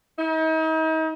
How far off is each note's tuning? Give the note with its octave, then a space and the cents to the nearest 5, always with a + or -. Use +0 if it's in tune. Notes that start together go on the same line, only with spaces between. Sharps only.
D#4 +40